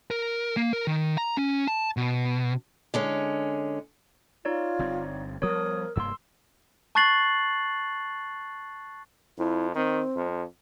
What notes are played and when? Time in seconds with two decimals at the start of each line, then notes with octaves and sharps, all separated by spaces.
0.11 A#4
0.57 A#3
0.73 A#4
0.87 D#3
1.18 A#5
1.37 C#4
1.67 A5
1.97 B2
2.94 D3 G#3 C#4
4.45 D#4 F4 C#5 D5
4.79 G1 G2 C4
5.42 F3 G3 B3 A#4 C#5 D#6
5.96 F1 G2 A#3 C6 E6
6.95 A5 C#6 F#6 A6 C7 F#7
9.38 F2 E4
9.75 D#3 C4
10.16 F2